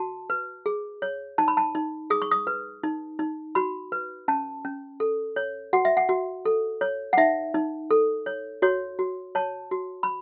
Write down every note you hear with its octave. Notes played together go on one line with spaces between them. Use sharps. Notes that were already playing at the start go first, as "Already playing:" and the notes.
Already playing: F#4 A5
B4
G#4
C#5
D#4 A5
B5
A5
D#4
G#4 D#6
C#6
D#6
B4
D#4
D#4
F#4 B5
B4
C#4 A5
C#4
A4
C#5
F#4 F#5
E5
F#5
F#4
A4
C#5
F#5
D#4 E5
D#4
A4
C#5
F#4 C#5
F#4
C#5 A5
F#4
B5